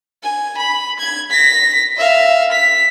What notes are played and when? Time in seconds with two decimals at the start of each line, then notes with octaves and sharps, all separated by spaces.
0.23 G#5
0.57 B5
0.99 G#6
1.30 A#6 B6
1.97 E5 F5
2.51 B6